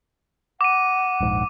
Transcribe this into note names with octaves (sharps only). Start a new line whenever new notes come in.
F#5 D6 D#7
D#1 A#1 G#2